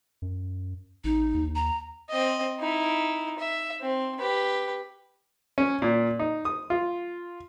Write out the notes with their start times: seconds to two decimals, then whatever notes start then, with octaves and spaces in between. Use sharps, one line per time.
0.22 F#2
1.04 A1 D#4
1.34 D#2
1.55 A#5
2.10 C4 D#5
2.60 D#4 E4
3.39 E5
3.81 C4
4.20 G4 B4
5.58 C#4
5.82 A#2
6.19 D#4
6.45 D#6
6.70 F4